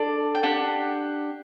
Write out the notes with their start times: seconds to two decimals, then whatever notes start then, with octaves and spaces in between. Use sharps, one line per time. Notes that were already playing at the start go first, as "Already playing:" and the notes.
Already playing: D4 A4 D5
0.35 G5
0.43 D4 G4 F#5